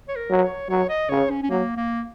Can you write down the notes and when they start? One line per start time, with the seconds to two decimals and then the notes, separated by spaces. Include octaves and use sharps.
0.09 C#5
0.16 A#4
0.30 F#3
0.43 C#5
0.69 F#3 C#5
0.89 D#5
1.10 C#3 C#5
1.30 C#4
1.43 C#4
1.50 F#3 A#3
1.77 A#3